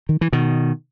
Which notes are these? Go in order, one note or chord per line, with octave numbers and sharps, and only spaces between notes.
D#3
E3
B2 D#3